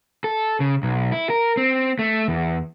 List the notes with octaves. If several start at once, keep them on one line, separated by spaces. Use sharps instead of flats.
A4
C#3
B1
E4
A#4
C4
A3
E2